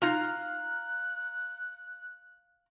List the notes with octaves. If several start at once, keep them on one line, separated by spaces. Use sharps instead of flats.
D#4 F4 F5 A#5 F#6